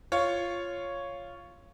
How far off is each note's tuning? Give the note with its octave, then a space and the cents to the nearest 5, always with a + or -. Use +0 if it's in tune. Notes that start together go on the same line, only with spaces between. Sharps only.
F4 -5 C#5 +0